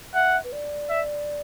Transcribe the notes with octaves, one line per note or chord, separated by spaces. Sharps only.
E5 F#5
B4
D5
E5